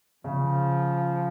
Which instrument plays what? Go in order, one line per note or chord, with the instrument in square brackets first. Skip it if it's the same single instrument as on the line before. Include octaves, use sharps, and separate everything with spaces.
[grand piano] C#3 [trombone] F3